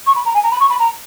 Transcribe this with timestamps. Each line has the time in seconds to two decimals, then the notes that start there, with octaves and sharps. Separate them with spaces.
0.06 C#6
0.15 B5
0.25 A#5
0.34 G#5
0.43 A#5
0.51 B5
0.60 C#6
0.69 B5
0.79 A#5